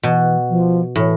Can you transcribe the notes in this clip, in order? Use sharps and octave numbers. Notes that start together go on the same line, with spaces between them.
B2 E3
F3
A2 E3